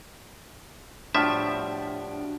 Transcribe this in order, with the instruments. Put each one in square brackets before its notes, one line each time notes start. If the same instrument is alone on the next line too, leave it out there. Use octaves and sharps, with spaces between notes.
[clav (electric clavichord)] A2 F3 E5 [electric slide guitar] D4 F#4 G4